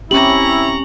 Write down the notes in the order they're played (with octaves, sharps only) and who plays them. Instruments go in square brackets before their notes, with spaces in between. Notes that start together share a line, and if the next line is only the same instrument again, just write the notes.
[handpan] C4 C#4 G4 [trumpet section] E4 [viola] A#5 C#6 [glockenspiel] F#7